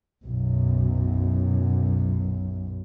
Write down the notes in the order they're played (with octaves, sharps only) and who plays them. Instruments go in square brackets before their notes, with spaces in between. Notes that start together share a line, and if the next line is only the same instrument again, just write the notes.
[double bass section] B1 F#2